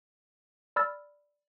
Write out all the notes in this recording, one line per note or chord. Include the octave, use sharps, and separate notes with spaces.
D5 B5 E6 F6 A6